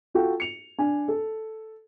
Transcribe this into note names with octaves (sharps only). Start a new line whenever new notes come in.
F4 F#4 A4 G5
C#7 F7
D4 G#5
A4